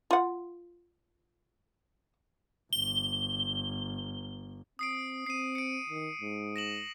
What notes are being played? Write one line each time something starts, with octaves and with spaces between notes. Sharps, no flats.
F4 F#5
G1 G7
C4 D#6 C7 D7
C4 C7 D#7
C#7 D7
D#3
G#2
A#6 E7 F#7